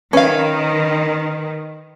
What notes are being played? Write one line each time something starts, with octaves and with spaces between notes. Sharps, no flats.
D#3 C#4 B4 F5